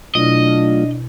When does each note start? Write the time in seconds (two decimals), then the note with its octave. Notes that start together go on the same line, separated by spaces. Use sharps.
0.15 B2 F#3 A3 D4 E4 F4 D#5